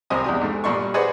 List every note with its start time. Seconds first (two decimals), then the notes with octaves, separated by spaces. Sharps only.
0.10 C2 C3 C5 D#5 G#5 D#6
0.24 E2 D4 G4 D#6
0.42 G#2 A3
0.64 G2 A#2 G3 D4 C6 C#6
0.94 G#4 B4 C5 D5 D#5 F#5